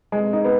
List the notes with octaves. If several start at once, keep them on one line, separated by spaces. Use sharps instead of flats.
G#3
D#4
B3